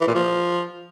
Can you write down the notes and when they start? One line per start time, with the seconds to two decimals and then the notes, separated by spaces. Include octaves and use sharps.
0.01 E3
0.08 A#2
0.15 F3